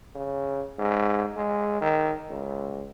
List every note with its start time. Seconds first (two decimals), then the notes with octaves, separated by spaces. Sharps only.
0.15 C#3
0.79 G#2
1.36 G#3
1.81 D#3
2.30 C#2